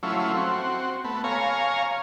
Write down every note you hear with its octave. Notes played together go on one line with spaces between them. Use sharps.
F#3 A3 C#4 E4 F4
C4 F#4
A3 B3
C#5 F5 G#5 A#5